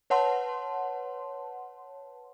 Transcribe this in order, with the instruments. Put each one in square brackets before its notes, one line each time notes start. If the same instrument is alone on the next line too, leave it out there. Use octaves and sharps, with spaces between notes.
[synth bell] B4 C#5 F#5 A5 C6